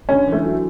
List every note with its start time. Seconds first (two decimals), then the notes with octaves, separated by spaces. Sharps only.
0.09 D3 C#4
0.27 E3
0.32 A3
0.44 F#3